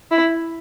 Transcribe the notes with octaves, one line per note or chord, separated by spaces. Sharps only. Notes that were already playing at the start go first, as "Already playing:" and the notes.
E4